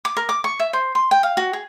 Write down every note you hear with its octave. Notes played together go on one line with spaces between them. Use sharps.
D6
A#4
D6
C#6
E5
C5
C6
G5
F5
F#4
G#4